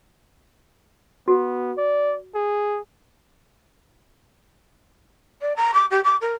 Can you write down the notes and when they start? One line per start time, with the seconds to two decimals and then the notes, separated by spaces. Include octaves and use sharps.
1.28 B3 F#4
1.78 D5
2.35 G#4
5.41 D5
5.56 A#5
5.74 D6
5.90 G4
6.04 D6
6.21 A#4